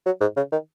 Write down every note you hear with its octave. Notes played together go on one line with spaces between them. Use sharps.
F#3
G#2
C#3
D#3